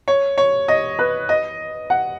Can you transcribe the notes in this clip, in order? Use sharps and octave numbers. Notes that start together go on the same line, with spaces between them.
C#5
C#5
D#5
B4
D#5
F#5